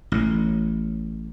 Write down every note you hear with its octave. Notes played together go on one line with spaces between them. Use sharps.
A1 A2